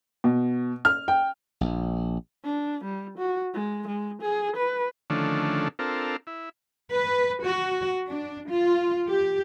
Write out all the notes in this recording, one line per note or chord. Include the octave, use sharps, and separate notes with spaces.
B2
F6
G5
A#1
D4
G3
F#4
G#3
G#3
G#4
B4
D3 D#3 F3 A3 C#4 D4
C4 D4 F4 A4 A#4
E4
B4
F#4
D4
F4
G4